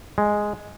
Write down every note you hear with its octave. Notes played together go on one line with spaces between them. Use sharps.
G#3